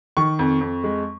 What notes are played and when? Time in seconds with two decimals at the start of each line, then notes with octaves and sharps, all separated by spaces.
0.17 D#3 C#6
0.39 F2
0.61 F2
0.84 G#3